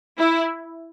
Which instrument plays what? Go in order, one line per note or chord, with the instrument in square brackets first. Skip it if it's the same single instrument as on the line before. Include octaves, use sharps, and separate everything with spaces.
[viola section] E4